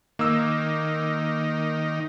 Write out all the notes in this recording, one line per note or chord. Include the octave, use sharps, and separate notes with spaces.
D#3 A#3 E6